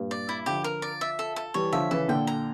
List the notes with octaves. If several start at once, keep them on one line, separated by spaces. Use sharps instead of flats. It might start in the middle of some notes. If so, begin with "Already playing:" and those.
Already playing: G2 A#2
D5
E4
D3 F3 G4
A#4
D5
E5
A4
A4
E3 G3 C#5
D3 F3 E5
C#3 E3 A4
A#2 D3 G5
A#5